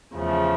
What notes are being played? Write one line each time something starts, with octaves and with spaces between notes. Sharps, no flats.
E2 C#3 F3 A3